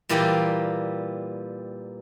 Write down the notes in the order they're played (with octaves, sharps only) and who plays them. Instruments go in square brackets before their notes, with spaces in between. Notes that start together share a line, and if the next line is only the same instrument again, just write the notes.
[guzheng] A#2 E3 G3 A#3 G4 G5